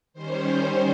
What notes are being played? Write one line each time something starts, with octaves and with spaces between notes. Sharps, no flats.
D#3 G3 C#4 C5